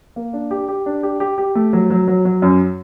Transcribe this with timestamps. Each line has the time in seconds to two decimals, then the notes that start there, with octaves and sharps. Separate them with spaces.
0.16 A#3
0.33 D4
0.51 G4
0.68 G4
0.86 D4
1.03 G4
1.20 G4
1.38 G4
1.55 A3
1.73 F#3
1.90 F#3
2.08 F#3
2.25 F#3
2.42 F#2